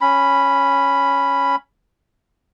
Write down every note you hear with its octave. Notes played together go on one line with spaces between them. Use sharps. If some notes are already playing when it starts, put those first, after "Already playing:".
C#4 B5